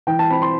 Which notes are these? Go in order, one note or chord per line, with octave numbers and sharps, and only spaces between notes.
E3 G5
A5
C4 B5
C6